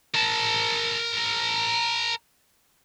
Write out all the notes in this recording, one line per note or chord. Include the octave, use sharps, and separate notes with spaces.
A#4 A5